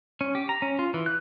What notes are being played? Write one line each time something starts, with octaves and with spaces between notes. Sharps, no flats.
C#4
G4
A#5
C#4
F4
E3
F#6